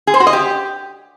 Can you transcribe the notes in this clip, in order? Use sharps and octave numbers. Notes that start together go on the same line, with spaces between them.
G#4
C5
F#4
D#5
G4